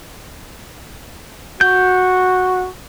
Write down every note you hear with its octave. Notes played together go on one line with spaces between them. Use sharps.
F#4 G6